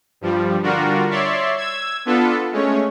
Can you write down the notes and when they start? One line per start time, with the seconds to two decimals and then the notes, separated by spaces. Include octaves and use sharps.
0.21 G2 F3 G3
0.62 D3 G3 D4 F4 F#4 A#4
1.10 C#5 D5 E5 C6
1.57 E6 G#6
2.05 B3 D4 F4 A4 B4
2.52 G#3 A3 C#4 C#5